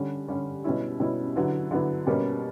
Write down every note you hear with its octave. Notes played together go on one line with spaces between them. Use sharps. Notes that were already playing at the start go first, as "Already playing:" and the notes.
Already playing: D3 G3 C#4
D3 G3 C#4
B2 G3 C#4 E4
B2 G3 C#4 E4
D3 F#3 B3 E4
D3 F#3 B3 E4
B2 G3 A#3 C#4